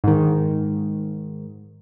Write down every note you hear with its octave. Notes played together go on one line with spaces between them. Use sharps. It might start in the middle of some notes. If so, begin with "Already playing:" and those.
G#2 D#3